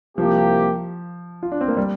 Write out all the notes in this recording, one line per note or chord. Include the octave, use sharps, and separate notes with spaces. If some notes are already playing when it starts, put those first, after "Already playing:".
C2 C3 F3 A#3 G4
F4
D4
C4
A#3
G3